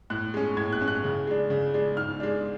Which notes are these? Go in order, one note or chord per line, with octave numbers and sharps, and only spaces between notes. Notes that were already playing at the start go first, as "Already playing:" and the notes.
A2 F#6
G#3 C#4
A2 G#6
F#6
G#3 C#4
F#6
C#3
G#3 D4
C#3
G#3 D4
G#2 F6
G#3 D4